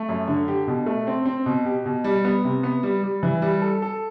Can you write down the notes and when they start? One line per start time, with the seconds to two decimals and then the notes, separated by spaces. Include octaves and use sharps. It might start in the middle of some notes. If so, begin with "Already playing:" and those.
Already playing: A3
0.09 F#2
0.28 D3
0.48 G4
0.67 B2
0.86 A3
1.07 C4
1.26 C4
1.46 B2
1.65 G4
1.85 B2
2.04 G3
2.25 B3
2.44 C3
2.63 B3
2.83 G3
3.03 G3
3.23 E3
3.42 G3
3.62 A4
3.82 A4